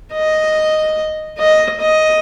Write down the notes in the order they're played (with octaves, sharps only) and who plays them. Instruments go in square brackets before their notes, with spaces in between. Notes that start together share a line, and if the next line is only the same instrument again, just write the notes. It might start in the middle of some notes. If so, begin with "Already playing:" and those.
[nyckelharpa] D#5
D#5
D#5